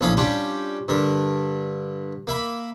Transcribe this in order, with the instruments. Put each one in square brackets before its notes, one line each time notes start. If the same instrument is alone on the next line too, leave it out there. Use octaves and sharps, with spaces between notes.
[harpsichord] A#1 A2 C#4 F5 B5 D#6
G3 C#4 D4 F4 G4
G2 D3 A#4
A#3 E5 B5